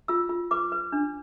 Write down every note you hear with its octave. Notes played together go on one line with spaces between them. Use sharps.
F4 E6
F4
B4 D6
B4
D4